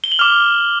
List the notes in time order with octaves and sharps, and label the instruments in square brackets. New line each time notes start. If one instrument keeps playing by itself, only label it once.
[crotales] G7
F#7
D6 F6 F7